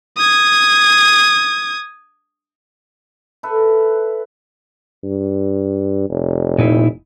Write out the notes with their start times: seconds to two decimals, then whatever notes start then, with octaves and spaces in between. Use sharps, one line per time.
0.18 D#6 G#6
3.43 A4 B4 E5
5.04 G2
6.09 F1
6.58 A#2 D#4 E4